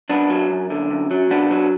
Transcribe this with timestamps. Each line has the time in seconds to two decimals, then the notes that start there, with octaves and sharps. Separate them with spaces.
0.10 F#2 B3 D4
0.30 F#3
0.50 F#2
0.70 D3
0.91 F#2
1.11 F#3
1.30 B1 B3 D4
1.51 F#3